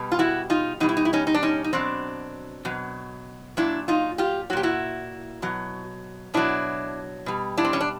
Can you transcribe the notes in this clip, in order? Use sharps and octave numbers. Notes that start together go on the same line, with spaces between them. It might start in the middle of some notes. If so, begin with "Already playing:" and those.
Already playing: B2 G3
F4
E4 F#4
D#4 F4
B2 G3 D#4
E4
D#4
E4
C#4 D#4
D#4
D4
C#4 D#4
D#4
B2 F#3 C4 D4
B2 F#3
A#2 F#3 D4 E4
D#4 F4
F4 G4
A#2 F#3 F#4 G4
E4 F#4
B2 F#3
B2 F#3 D4 E4
B2 G3
D4 E4
C4
C#4
D4